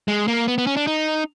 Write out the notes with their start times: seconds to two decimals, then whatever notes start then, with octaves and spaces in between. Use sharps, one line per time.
0.08 G#3
0.28 A#3
0.48 B3
0.58 B3
0.67 C#4
0.77 D4
0.87 D#4